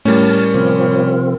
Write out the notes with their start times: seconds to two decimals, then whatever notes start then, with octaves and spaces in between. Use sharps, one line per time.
0.05 A2 G3 C#4 A#4 A5
0.54 C3 F3 C4